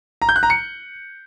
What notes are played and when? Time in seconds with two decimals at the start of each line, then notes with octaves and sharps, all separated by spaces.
0.22 A#5
0.29 G6
0.36 F#6
0.43 A#5
0.50 C#7